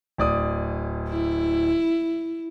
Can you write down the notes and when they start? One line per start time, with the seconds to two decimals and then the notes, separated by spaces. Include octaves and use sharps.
0.18 D1 D5 D#6
1.10 E4